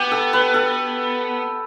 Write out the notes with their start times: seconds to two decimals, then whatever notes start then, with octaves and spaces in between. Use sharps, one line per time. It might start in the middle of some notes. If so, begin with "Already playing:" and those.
Already playing: B3 G4
0.12 A4
0.33 B4
0.54 A4